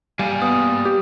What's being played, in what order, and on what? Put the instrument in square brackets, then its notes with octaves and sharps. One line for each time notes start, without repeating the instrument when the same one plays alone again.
[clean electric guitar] G3 [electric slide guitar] A#3 F5 G#5
[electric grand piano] B3 [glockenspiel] D#6
[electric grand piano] G4